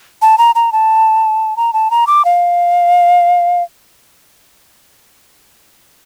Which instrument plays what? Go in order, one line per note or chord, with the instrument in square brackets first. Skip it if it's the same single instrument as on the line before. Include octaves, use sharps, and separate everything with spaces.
[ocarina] A5
A#5
A#5
A5
A#5
A5
A#5
D6
F5